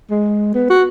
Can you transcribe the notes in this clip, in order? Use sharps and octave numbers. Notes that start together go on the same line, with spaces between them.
G#3
B3
F#4